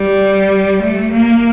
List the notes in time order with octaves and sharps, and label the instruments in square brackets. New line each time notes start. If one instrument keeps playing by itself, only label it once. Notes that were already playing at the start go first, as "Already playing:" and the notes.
Already playing: [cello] G3
A3
A#3